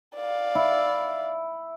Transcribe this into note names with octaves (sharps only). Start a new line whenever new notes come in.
D5 F5
E4